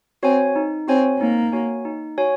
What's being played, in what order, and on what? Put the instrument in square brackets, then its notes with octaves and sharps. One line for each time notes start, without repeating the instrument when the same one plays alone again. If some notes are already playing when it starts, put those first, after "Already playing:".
[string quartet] C4 [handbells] F#4 C#5 G#5
[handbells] D#4
[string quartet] C4 [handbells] F#4 C#5 G#5
[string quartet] A#3 [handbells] D#4
[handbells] F#4 C#5 G#5
D#4
F#4 C#5 G#5